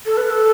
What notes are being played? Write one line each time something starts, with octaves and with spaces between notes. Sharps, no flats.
A4
B4
A4